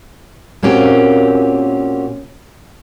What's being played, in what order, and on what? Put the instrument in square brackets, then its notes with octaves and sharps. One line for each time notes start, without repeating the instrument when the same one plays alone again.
[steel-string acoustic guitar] A#2 A#3 C4 C#4 F#4 G4